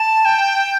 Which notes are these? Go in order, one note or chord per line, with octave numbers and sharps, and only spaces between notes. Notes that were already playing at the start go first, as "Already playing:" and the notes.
Already playing: A5
G5